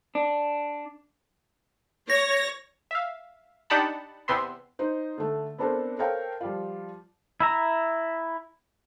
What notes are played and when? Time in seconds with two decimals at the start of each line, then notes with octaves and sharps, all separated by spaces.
0.15 D4
2.10 C#5 A#6
2.91 E5 F5
3.70 D4 D#4 G4 F#5 A5 B5
4.28 E2 C3 B3 E5 C6
4.79 D#4 C5
5.18 D3 A3
5.58 B3 C4 D4 A4 A#4 C5
5.99 A4 A#4 C5 C#5 F5 G5
6.41 F3 G3 F4
7.40 E4 E5 A#5